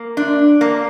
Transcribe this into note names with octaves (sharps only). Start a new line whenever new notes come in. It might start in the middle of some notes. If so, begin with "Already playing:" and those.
Already playing: A#3
D4
A#3